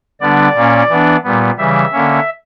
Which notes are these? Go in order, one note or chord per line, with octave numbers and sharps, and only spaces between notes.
D3 G3 B3 D4 D5
A#2 A#3 C#4
E3 B3 D4
A#2 G3 B3
C#3 E3 G3 E5
D3 A#3 C#4